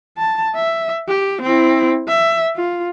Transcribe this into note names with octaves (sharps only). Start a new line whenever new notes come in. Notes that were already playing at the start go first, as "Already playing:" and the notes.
A5
E5
G4
C4 E4
E5
F4